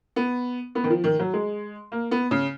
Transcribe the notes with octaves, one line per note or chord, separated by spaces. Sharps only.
B3
B3
D#3
F3
D#3
F#3
G#3
A#3
B3
C#3